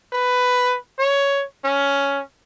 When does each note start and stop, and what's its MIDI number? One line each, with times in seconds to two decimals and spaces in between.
0.13 0.77 71
0.99 1.44 73
1.65 2.21 61